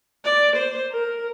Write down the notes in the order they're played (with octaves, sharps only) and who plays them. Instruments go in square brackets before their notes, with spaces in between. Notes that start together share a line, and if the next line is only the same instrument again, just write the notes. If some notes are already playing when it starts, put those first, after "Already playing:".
[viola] D5
C5
A#4